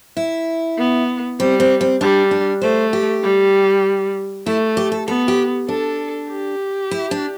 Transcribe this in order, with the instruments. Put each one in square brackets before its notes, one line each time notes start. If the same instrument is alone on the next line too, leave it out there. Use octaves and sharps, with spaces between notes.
[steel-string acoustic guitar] E4
[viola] B3
[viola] G3 [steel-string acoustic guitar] C4
[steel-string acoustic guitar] C4
C4
[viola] G3 [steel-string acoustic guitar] D4
[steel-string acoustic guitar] D4
[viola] A3 [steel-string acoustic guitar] C5
[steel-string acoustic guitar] G4
[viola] G3
[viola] A3 [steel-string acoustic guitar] E4
[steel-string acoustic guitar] G4
A4
[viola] B3 [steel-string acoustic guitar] A4
[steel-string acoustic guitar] G4
[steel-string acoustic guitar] D4 [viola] A4
[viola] G4
[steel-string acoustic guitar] E4
D4